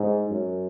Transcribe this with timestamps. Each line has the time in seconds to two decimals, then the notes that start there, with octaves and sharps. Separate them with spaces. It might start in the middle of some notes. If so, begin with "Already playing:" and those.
Already playing: G#2
0.31 F#2